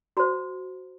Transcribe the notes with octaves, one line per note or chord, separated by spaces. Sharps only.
F#4 C5 A#5